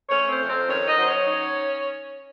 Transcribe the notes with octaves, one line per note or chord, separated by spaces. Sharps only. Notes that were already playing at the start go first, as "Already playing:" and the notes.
A3 C#4 C#5
C4 C5
F2
C4 C5
D#3 C#4 C#5
D#4 D#5
F#3 C5
C#4 C#5
D#4